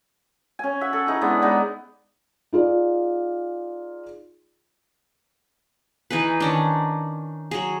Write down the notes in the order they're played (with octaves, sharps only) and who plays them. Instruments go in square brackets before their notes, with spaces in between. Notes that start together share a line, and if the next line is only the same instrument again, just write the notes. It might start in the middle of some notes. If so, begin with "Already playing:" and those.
[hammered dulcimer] C#4 G#5
E5 F#5
A4
E3 D#4 G#4
G#3 B3 D4 E4
G#3 B3 D#4 D5
[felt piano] D#4 F4 G#4 D5
[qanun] E3 D#4 G#4 B4
D#3 C#4 D4
F#3 G#4